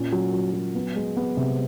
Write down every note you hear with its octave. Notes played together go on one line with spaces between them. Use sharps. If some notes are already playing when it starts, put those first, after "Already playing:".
Already playing: A#2 C#4
F#3
F#3
F#3
B3
G#3
B3
C3